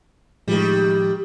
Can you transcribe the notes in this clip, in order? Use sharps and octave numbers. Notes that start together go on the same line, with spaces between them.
A2 D#3 F3 G3 G#3